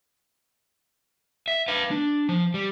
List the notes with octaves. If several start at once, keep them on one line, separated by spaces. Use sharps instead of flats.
E5
B4 F5
D4
F3
G3